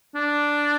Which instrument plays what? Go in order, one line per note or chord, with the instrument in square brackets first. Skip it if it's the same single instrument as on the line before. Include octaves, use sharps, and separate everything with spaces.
[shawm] D4